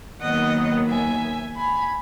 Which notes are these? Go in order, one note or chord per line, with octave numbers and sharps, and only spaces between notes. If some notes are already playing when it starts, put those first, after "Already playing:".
D#2 D#3 F#3 B3 D#5 F#5
E5 G#5
G#5 B5